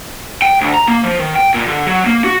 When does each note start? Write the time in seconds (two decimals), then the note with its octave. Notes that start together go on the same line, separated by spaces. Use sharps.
0.42 G5
0.61 D2
0.74 A#5
0.88 A#3
1.04 F3
1.19 D#3
1.35 G5
1.54 A#2
1.67 D3
1.87 F#3
2.06 A#3
2.25 F#4